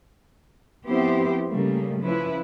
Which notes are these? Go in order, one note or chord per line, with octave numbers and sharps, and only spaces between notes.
F3 B3 C4 E4 G4 C5
C#3 G3 A3 A#3
F3 C#4 E4 B4